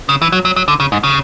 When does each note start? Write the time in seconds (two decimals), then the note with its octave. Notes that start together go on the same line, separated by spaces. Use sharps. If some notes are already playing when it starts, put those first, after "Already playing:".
0.09 C#3
0.22 E3
0.32 F#3
0.45 F#3
0.56 F#3
0.68 D3
0.80 C#3
0.92 G#2
1.04 C#3